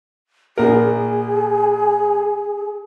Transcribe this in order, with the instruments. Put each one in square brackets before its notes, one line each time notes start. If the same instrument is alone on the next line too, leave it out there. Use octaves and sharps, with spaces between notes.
[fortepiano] A#1 A#4 [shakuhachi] G#4